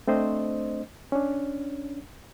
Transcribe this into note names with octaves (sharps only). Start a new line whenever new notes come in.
A3 C4 D4 C5 D#5
C#4 D4